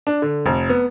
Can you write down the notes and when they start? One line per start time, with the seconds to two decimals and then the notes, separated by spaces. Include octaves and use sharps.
0.07 D4
0.22 D3
0.46 F1
0.69 B3